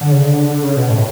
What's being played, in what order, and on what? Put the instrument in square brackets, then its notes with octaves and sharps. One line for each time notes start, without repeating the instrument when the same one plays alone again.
[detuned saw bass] D3
C#3
D3
C#3
B2
A2